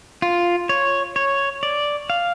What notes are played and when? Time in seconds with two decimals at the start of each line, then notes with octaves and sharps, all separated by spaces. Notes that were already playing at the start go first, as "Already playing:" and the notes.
0.22 F4
0.69 C#5
1.16 C#5
1.63 D5
2.10 F5